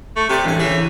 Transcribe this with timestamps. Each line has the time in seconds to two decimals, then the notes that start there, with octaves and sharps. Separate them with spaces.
0.16 A3
0.29 C3 G4 D5
0.45 A1 G2 G#5
0.59 C#3 E3 G#4